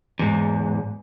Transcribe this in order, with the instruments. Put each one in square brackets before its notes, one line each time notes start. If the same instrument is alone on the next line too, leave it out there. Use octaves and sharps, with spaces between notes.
[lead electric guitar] E2 G#2